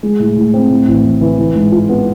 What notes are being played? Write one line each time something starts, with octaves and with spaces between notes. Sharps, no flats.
G#3
A2
A2
C4
A2
A1
A1
E3
E3
G#2
F4
B3